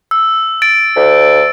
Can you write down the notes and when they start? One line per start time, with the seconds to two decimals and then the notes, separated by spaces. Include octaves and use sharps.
0.11 E6
0.62 A6 D7
0.96 D2